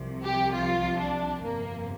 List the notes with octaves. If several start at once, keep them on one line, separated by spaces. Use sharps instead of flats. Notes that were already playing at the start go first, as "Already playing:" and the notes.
Already playing: C2 C3 F3
G4
F4
D4
G1 F2 C3 F3 A#3